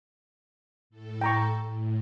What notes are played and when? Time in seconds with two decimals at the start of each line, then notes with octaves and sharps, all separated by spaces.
0.90 A2 A4
1.21 G5 A#5 C#6
1.63 A2